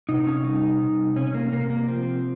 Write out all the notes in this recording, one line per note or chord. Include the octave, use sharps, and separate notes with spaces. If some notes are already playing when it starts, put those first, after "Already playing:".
C3 D#4
C#4
G3 D#4
C3
C3 C#4
A#3
C3 A#3
A#3
F3 C4